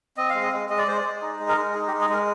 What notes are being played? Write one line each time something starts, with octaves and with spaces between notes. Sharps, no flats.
C4 D#5
G#3 F5
D#5
G#3
G#3 D#5
D5
G#3 C5
D5
G#3
D#4
G#3
A#4
G#3
D#4 G#4
G4
G#3
G#4
G#3 A#4